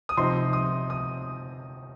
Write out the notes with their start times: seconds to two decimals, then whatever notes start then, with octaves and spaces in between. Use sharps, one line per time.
0.09 D#6
0.17 C3 F3 C4 D#4 C6
0.53 D#6
0.90 D#6